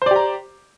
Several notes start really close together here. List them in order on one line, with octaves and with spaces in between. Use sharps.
C5 D5 G4 A#5